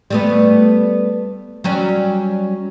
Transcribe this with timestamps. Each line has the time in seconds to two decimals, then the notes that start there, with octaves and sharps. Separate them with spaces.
0.10 G3 A3 B3
1.64 F#3 G3 C#4